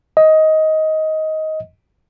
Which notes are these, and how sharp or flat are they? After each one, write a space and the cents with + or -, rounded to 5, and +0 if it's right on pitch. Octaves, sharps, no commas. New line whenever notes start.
D#5 +15